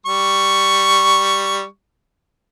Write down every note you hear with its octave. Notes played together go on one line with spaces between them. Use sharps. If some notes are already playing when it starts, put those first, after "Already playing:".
G3 C#6